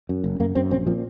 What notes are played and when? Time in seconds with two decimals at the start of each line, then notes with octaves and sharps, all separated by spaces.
0.09 F#2
0.24 F#1
0.40 F#2 A#3
0.55 F#2 C4
0.71 A#1 C4
0.87 A#2 F3